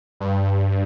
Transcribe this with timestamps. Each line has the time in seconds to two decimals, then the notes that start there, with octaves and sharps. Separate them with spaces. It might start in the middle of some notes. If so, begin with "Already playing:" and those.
0.20 G2